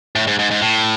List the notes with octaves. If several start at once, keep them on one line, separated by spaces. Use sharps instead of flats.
A2
G#2
G#2
G#2
A2